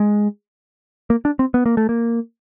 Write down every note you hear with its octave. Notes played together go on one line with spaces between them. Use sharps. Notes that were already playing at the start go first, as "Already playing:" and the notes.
Already playing: G#3
A#3
D4
C4
B3
A#3
A3
A#3